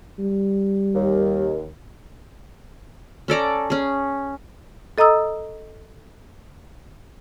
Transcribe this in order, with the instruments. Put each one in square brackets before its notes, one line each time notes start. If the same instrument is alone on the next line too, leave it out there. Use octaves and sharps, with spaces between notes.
[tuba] G3
[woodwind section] D#2
[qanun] C#4 A4 D5 A#5
C#4 G#4
[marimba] A4 D#5 A#5 D#6 E6